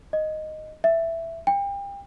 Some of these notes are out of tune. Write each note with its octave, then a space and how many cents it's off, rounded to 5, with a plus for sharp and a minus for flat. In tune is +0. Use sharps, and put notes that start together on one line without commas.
D#5 -5
E5 +5
G5 +35